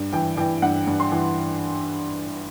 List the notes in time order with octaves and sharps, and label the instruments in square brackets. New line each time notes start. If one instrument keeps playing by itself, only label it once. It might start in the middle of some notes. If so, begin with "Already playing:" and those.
Already playing: [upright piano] G2
E3 G5
E3 G5
G2 F#5
G2
C6
E3